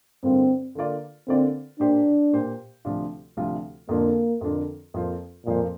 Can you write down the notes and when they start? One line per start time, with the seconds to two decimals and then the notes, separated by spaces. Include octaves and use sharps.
0.23 G2 D3 A#3 C4 F4
0.75 D3 A#3 F4 D5
1.28 D3 A#3 C4 F4 D5
1.80 A#2 A#3 D4 G4 C5
2.33 A#2 A#3 G4 C5
2.85 D2 C3 F3 D4 F4
3.37 D2 C3 F3 D4 F4
3.89 F2 D3 F3 A#3 D4 A#4
4.41 F2 D3 F3 D4 A#4
4.94 F2 F3 A#3 F4 C5
5.46 F2 A#2 F3 A#3 F4 C5